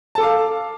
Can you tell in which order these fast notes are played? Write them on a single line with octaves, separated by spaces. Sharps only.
A5 A4 D6 F5